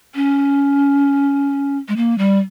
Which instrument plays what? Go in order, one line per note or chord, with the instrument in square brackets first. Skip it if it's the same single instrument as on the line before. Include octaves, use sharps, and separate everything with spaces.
[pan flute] C#4
G#3
A#3
G3